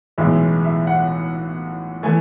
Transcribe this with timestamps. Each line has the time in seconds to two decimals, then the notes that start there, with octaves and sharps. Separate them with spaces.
0.18 B1 A2 E3 G#3 E5
0.65 E5
0.87 F#5
2.03 E3 A3 G#5